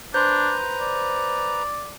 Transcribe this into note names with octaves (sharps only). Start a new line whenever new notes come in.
D4 B4 C5 A#5 C6 G6
D5